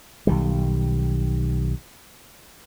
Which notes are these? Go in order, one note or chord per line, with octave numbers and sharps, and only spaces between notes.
B1 D#3 G3